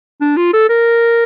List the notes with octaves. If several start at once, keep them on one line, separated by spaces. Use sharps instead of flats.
D4
F4
A4
A#4